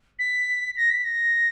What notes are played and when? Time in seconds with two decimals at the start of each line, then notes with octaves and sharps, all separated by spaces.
0.19 B6
0.77 A#6
0.91 B6
1.05 A#6